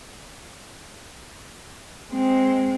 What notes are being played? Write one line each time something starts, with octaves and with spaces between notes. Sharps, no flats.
G#3 C4